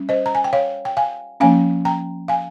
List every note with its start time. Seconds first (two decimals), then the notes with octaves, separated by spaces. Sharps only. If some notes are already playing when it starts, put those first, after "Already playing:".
Already playing: G3 C#4
0.09 C5 D#5
0.26 A#5
0.35 G#5
0.44 G5
0.53 C#5 F5
0.85 G5
0.97 F5 G#5
1.40 F3 A#3 C#4 F5 G#5
1.85 G5 A#5
2.28 F5 G#5